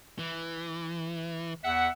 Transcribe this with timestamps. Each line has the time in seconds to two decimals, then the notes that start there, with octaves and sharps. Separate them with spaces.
0.19 E3
1.64 E2 E5 F#5